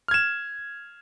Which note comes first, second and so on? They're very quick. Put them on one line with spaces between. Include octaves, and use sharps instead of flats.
F6 G#6 E7